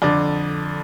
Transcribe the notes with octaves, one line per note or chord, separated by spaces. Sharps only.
F2 D3 D5